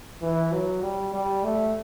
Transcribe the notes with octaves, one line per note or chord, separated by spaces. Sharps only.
E3
F#3
G3
G3
A3